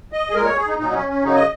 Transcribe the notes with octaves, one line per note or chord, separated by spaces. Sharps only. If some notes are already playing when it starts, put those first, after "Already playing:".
D#5
G#4
A#2 G#3 A#4
C#5
G#4
D#4
A#2 F#3 D#4
C#4
C#4
F#2 C#3 F#3 D#4
D#5